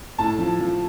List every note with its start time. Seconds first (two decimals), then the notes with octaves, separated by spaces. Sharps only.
0.18 A2 A5
0.38 F3
0.60 F3